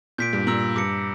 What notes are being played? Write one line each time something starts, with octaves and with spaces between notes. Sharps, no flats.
A#2 G6 B6 D7
G2
A#2 A#5 E6 A#6 D7 F#7
G2 D6 A#6 C#7